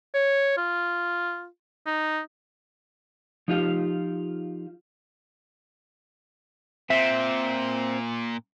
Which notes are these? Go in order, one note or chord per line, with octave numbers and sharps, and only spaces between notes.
C#5
F4
D#4
F3 D#4 F4 G4 F5
A#2 C4 E5